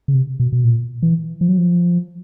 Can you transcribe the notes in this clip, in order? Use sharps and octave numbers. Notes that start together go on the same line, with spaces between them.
C#3
C3
B2
B2
A#2
E3
F3
F#3
F3